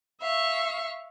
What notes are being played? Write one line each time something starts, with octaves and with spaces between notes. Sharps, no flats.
E5 F5 C#6